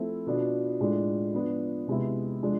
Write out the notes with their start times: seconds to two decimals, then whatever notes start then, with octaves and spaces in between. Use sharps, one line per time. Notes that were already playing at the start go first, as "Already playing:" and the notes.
Already playing: F3 A3 C4 E4
0.26 B2 B3 D4 F4
0.80 A2 G#3 D4 F4
1.34 F3 B3 D4 F4
1.88 C3 G#3 B3 E4
2.42 F3 G#3 D4 F4